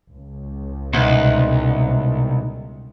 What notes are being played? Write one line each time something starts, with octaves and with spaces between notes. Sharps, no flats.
C#2
C2 B2 B3 D#4